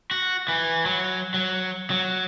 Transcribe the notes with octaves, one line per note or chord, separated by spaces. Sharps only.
F#4
E3
F#3
F#3
F#3